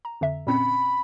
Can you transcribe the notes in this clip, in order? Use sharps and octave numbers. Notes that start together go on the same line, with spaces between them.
A#5
F2 D3 E5
A#2 C4 C#4 B5